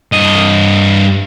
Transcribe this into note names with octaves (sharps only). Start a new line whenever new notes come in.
G2 D#5